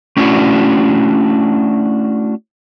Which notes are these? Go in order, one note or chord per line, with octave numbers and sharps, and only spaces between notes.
A3 C#4 D4 E4 F#4